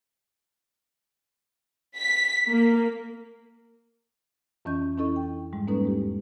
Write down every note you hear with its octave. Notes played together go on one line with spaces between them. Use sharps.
B6
A#3
F2 E3 C#4 D#5 G6
C#4 D4 E4 A4 D#5 C#6
G5
G#2 G3 G#3
G#3 A#3 C#4 D#4 A4 B4
E2 G4